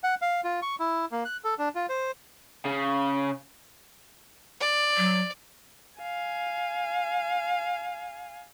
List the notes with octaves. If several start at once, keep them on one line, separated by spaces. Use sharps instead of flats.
F#5
F5
F4
C#6
E4
A#3
F#6
A4
D4
F4
C5
C#3
D5
F#3
F5 G#5